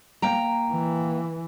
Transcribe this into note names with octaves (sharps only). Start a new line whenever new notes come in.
A#3 G5 A#5
E3